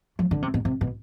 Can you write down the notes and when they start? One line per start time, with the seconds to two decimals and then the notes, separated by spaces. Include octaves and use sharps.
0.19 F3
0.31 D3
0.42 C3
0.54 B2
0.65 C3
0.81 B2